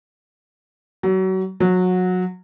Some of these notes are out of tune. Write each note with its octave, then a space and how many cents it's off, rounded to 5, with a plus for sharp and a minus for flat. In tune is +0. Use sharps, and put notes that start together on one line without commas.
F#3 +30
F#3 -20